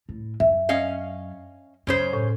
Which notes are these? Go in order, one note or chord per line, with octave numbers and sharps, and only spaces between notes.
A2
F#2 E5
C#4 D#5 F5
F#2 C#3 C#4 C5
A2